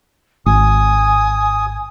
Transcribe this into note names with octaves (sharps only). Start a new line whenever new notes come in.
G#1 G#5 D#6